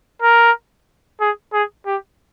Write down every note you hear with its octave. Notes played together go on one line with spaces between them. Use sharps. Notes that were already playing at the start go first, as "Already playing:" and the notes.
A#4
G#4
G#4
G4